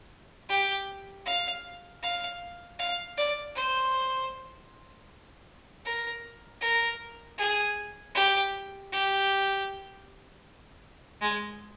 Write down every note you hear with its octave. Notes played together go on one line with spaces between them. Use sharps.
G4
F5
F5
F5
D5
C5
A#4
A#4
G#4
G4
G4
G#3